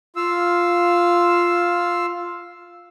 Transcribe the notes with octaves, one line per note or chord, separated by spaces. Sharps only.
F4 F5 E6